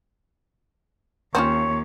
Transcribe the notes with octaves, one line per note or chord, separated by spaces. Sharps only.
D#2 C4 C#4 F4 C#5